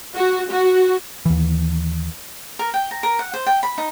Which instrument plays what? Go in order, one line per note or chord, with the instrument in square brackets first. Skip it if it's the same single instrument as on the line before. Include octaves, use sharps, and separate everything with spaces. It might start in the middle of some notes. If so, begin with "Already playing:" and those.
[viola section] F#4
F#4
[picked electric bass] D#2 E3
[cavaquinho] A#4
G5
A#5
A#4
F#5
C5
G5
B5
D#4